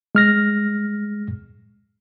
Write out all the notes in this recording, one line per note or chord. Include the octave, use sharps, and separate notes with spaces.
G#3 F6 A#6